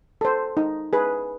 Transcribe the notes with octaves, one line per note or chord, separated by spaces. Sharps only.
A4 C5
D#4
G#4 B4